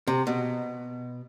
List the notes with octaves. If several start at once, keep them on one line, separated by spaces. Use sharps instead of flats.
C3
B2